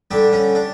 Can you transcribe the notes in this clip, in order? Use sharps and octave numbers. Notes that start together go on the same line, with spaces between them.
D3 G3 D4
C#4
D4